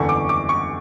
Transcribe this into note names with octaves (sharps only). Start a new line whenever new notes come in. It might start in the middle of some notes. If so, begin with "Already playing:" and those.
Already playing: F#1 E2 D3 C#6
D6
D6
C#6